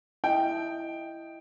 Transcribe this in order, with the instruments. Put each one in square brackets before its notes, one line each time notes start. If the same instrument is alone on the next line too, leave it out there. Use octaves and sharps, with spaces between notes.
[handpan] E4 D#5 [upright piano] G5